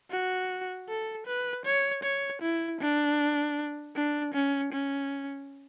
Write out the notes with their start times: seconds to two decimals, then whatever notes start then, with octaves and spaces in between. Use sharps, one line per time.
0.11 F#4
0.89 A4
1.27 B4
1.65 C#5
2.03 C#5
2.42 E4
2.81 D4
3.95 D4
4.34 C#4
4.73 C#4